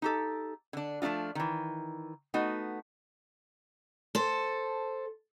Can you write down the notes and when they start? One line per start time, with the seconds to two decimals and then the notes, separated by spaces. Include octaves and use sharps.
0.02 D#4 G4 A4
0.73 D3 D4
1.02 F3 A3 D4 D#4 F4
1.35 D#3 E3
2.34 A3 B3 D#4 F#4
4.15 A4 C5